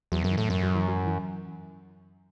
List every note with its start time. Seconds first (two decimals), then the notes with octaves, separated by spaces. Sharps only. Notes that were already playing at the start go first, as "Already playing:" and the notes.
0.12 E2 F#3
0.24 F#2
0.31 E3
0.37 A2
0.50 F#2 F#3
0.63 F#3
0.75 E3
0.88 F#3
1.07 E3